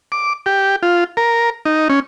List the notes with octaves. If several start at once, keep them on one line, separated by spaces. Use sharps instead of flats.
D6
G4
F4
A#4
D#4
C#4